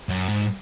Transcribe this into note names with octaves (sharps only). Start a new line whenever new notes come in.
F#2
G#2